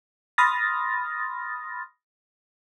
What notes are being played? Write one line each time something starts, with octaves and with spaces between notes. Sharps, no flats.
B5 C6 D#6 F6 A6 A#6